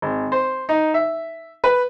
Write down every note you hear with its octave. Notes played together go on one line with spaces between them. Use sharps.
G#1
C5
D#4
E5
B4